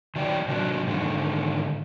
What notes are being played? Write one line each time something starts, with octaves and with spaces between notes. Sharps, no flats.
D#3 F#3 D5 G5
C3 F#3 D4 F#4
G#2 D3 D#3